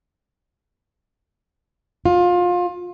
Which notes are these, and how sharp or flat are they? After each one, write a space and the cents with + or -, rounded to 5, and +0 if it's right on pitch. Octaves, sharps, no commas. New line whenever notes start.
F4 +25